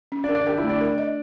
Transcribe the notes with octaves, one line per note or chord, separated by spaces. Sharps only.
C#4
D4 D5
A#4
D4 D5
G4 A#4 G5
E4 E5
A3
D4 D5
A#4
D#5